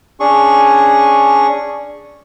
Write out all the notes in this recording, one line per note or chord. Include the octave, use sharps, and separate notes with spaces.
C#4 D4 G#4 C#6